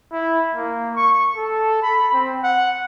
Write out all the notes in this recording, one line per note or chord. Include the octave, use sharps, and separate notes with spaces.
E4
A#3
C#6
A4
B5
C4
F#5